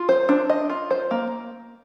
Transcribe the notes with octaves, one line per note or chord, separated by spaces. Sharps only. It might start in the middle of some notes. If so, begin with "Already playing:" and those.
Already playing: F4
C5
D4
D#5
F4
C5
A#3